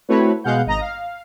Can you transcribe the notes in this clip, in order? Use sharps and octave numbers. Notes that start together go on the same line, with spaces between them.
A3 C4 E4 F#4 B4 C#5
B2 G#3 F5 F#5 G6
G#1 D#5 A#5 A#6
F5